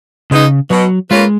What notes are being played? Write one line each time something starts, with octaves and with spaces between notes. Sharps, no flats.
C#3 G#3 B3 D#4
B2 F#3
G#3 A#3 C#4 F4 B4